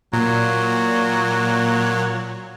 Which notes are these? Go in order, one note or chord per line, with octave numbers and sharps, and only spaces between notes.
A#2 F#3